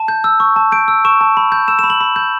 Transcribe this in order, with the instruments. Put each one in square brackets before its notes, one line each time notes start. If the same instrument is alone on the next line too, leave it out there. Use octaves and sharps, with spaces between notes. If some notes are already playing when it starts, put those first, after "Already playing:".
Already playing: [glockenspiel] A5
G6
E6
C#6
A5
G6 D7
E6
C#6 E7
A5
B5
G6
E6 E7
E7
B5
F#7
B5
G6